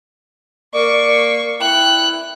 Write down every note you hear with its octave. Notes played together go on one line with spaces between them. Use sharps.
A#3 D5 C#6
E4 G5 F#6